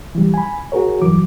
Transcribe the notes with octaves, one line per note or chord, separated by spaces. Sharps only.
E3 G3
G#5 B5
F#4 G#4 A#4 C#5
G2 E3 F#3 D6